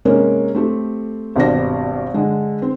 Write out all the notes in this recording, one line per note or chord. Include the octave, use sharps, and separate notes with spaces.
C3 G#3 A#3 C#4
A3 C4 G4 A4
G#1 G2 B2 G3 D5 A#6
D3 G#3
C4